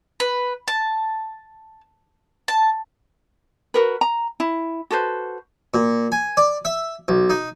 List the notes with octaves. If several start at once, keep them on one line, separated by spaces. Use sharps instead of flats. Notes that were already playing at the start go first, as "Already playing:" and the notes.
B4
A5
A5
F#4 A#4 B4
A#5
E4
F#4 A4 B4 C5
A#2
G#5
D5
E5
B1
D#4